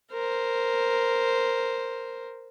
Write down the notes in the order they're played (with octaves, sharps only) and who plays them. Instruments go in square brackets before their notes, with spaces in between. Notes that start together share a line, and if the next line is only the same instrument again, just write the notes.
[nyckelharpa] A#4 C5